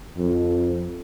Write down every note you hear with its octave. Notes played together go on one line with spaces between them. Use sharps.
F2